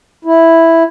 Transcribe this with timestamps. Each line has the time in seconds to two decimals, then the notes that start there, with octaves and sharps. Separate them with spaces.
0.25 E4